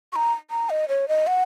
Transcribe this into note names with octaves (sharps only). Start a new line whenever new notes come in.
C#6
A#5
A#5
D#5
C#5
D#5
F#5